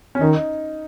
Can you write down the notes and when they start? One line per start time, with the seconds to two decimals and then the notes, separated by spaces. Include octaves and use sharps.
0.15 C#4
0.21 D#3 D#4